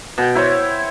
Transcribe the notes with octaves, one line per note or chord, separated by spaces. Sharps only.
B2 G5
E4 C5 C#5